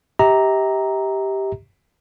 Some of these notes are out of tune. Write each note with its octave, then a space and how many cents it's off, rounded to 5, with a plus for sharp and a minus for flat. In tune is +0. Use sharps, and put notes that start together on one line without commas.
G4 +0 E5 -45 A#5 +0